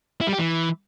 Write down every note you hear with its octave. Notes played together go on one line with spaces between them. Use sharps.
E4
G3
G4
E3